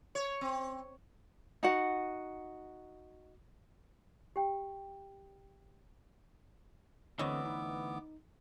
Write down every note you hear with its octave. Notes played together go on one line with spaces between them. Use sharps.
C#5
C4
D#4 F#4 F#5
G4 G5
D2 D3 E3 B3 C4 C#5 D#5 D6
D#4